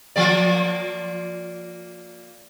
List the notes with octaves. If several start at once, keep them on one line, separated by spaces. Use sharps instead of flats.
F3 A#3 D5